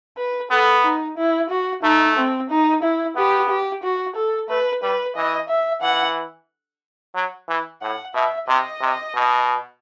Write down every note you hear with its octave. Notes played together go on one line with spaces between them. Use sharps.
B4
B3 A4
D#4
E4
F#4
A3 D#4
C4
D#4
E4
B3 G4
G4
F#4
A4
A3 B4
G3 B4
E3 D#5
E5
E3 F#5
F#3
E3
A2 F#5
B2 E5
C3 D#5
C3
B2